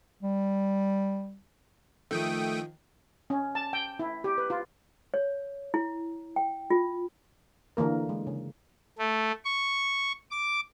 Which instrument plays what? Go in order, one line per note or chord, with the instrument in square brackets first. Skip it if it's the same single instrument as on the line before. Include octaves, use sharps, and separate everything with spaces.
[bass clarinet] G3
[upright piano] D#3 F3 [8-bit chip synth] A3 G5 D#6
[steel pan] C#4
A5
G5
E4
G4
B4
F4
[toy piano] C#5
E4
G5
F4
[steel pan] D3 E3 A#3 A#4
G#3
C#3
[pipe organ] A3
C#6
D6